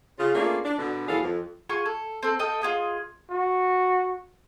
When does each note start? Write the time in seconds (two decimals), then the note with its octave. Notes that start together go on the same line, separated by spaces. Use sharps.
0.18 C#3 F4
0.34 A3 A#3 C#4 D4 F4 G#4
0.65 D4
0.79 B2 D3
1.08 D#2 E3 F#3 G#4 A4 F5
1.23 F2
1.69 F4 G#4 G#5 C#6
1.86 A4
2.23 C4 A4
2.39 A4 D#5 F5 G5
2.62 F4 G#4 D#5
3.30 F#4